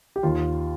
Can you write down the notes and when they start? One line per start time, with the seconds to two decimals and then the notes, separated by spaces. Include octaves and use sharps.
0.16 G4
0.23 D#2 F4